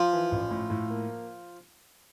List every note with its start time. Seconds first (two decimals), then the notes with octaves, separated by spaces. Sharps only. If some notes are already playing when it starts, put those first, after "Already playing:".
Already playing: F3
0.13 E3
0.31 A1
0.50 A2
0.70 A2
0.90 A#3